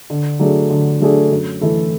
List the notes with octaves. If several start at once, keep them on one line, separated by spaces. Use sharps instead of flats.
D3
F#3 A3 D4 G#4
D3
F#3 A3 D4 G#4
F#2
E3 A3 E4 A4